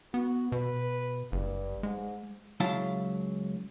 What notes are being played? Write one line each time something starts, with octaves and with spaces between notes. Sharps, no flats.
B3 F#4
B2 B4
F#1 G2
G#2 G#3
C#2 F#3 E4 F5 A5